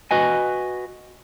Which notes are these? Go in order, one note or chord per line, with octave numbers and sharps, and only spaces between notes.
F#4 B4 D#5 G#5